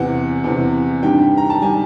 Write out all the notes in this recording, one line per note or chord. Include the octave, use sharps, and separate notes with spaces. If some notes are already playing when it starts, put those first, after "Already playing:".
Already playing: E2 C3 E3 F#5
E2 C3 E3
G2 D#3 G3 G5
A#5
A5
D#3 G3 G#5